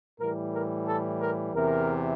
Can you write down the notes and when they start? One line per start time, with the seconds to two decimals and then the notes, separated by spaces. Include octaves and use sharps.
0.20 A2 E3 G3 A#4
0.53 A#4
0.87 A4
1.21 A#4
1.54 E2 C3 E3 A#4